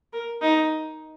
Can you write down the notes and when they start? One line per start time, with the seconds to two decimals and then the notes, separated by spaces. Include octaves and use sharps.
0.13 A#4
0.41 D#4